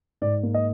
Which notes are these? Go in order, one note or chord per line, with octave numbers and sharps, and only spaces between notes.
G#2 D5
A#3
D#5